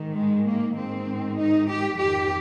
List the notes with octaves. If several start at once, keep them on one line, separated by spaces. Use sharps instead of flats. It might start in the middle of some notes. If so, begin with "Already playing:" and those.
Already playing: G#2 D#3
G#3
A#3
G#2 D#3 C4
D#4
G4
F2 D#3 G4